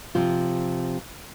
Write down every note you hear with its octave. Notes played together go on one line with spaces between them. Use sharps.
C3 F3 F4